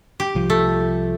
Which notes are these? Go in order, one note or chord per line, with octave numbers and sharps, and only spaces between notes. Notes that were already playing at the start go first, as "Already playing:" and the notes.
G4
C2 F3
A3